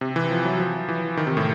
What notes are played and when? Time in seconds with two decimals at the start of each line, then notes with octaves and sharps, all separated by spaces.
0.01 C3
0.16 E3
0.31 F3
0.45 F#3
0.60 F3
0.88 E3
1.17 D#3
1.27 C3
1.37 A2